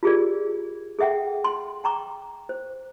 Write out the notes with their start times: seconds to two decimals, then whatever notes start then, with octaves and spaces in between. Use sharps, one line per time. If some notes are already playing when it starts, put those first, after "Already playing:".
0.03 F4 G4 G#4 A#4 D5
0.99 G#4 A4 E5 F#5 G5
1.44 C6
1.84 G5 A#5 C#6 D6
2.49 C5